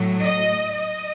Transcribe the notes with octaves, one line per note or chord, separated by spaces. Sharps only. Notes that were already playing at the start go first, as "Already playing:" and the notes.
Already playing: A2 F#3 A3
D#5
D#5